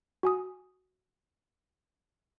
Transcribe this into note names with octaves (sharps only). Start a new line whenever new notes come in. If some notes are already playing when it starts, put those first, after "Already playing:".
F#4 G#5 D#6